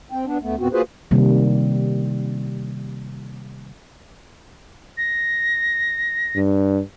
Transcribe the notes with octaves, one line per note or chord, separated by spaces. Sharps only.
C4 G5
B3 D4
D2 A3 B3
E2 A#2 B3 C4 F#4
A#3 F4 F#4 G#4 B4 C5
C3 D#3 G3 A#3
A#6
G2